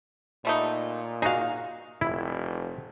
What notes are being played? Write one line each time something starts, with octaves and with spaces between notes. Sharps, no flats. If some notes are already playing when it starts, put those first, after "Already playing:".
A#2 G3 A3 D#4
D#4 F#4 G#4 F5
F1 E4